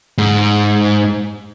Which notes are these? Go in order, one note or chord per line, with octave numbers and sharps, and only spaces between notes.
G#2